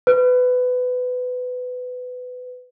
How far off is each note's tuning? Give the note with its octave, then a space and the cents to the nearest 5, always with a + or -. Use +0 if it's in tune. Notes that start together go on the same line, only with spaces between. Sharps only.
B4 +20